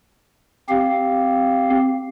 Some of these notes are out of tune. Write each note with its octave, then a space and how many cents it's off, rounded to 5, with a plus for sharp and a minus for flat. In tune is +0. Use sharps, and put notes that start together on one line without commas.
C4 +0 G4 -5 F5 +0